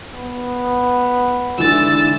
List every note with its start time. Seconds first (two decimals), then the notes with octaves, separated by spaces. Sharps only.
0.15 B3
1.58 G#2 D3 E3 A3 E4 E6 A6